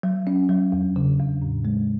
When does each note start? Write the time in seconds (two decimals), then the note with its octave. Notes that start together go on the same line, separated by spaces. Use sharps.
0.03 F#3
0.27 C#4
0.49 F#3
0.72 E2
0.96 C#3
1.19 E2
1.42 A2
1.65 G#3